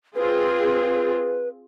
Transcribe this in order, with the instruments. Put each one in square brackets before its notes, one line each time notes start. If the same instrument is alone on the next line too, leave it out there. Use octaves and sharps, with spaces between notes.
[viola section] C4 F4 G#4 [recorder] B4